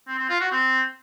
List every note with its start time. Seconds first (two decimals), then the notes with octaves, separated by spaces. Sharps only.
0.07 C4
0.18 C4
0.29 F4
0.41 F#4
0.52 C4